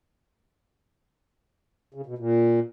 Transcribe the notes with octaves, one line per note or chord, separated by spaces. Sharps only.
C#3
B2
A#2